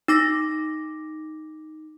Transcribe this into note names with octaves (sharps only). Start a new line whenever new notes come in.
D#4 D6 A#6